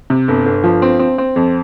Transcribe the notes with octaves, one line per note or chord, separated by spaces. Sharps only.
C3
G1
G1
F3
C4
C4
C4
F2